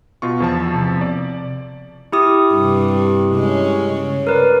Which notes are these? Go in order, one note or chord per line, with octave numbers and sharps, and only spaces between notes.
B2 F4 C#6
E2 F3 A5
C3
D5
E4 G4 D#6
G2 C3
G#3 C#4
C#3
A#4 B4 D5